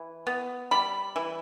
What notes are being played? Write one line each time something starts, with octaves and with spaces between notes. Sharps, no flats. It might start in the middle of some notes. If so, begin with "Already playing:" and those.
Already playing: E3
B3
G3 B5
E3